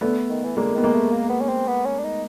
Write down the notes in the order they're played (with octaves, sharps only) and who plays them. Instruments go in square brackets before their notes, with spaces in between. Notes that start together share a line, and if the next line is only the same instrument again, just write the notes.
[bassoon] D3 [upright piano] A3 B3
[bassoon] D#3
E3
[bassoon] D3 [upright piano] G#3 A#3
[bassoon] D#3 [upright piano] B3
[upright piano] G#3 A#3
[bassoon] A3
A#3
B3
C#4
C4
B3
C#4
D4
D#4